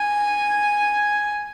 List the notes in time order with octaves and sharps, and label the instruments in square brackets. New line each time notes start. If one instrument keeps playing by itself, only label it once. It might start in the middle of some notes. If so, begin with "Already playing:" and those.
Already playing: [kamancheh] G#5